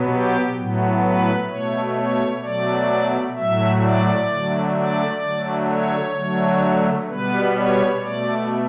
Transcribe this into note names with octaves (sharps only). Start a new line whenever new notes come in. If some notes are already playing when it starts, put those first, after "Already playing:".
Already playing: B2 F#3 B3
G4
A2 F#3 B3
B4
B2 A3 C#5
C#5
B2 F#3 A3 D5
A2 F#3 A3 E5
D5
D3 F#3 A3
D5
D3 F#3 A3
C#5
D3 F#3 A3
B2 G3 B3 B4
C#5
B2 A3 D5